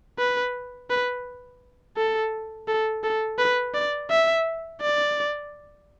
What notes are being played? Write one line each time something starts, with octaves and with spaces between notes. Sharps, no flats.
B4
B4
A4
A4
A4
B4
D5
E5
D5